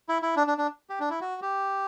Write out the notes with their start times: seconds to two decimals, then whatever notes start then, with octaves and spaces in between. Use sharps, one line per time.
0.09 E4
0.22 E4
0.36 D4
0.47 D4
0.58 D4
0.90 G4
1.00 D4
1.10 E4
1.21 F#4
1.42 G4